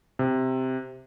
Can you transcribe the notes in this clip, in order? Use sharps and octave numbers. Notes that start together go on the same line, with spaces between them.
C3